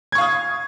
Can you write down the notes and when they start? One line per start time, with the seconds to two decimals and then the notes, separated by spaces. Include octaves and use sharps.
0.12 G#6
0.15 C#6
0.18 F5
0.21 D#6